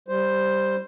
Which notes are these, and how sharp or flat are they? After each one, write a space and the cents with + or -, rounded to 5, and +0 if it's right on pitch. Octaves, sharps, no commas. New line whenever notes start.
G3 -5 C5 +0